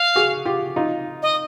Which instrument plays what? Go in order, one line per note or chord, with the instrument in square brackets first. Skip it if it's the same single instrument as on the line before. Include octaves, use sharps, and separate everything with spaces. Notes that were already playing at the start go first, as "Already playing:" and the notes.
Already playing: [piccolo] F5
[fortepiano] F#4 G#4
F4 G4
D#4 F4
[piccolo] D#5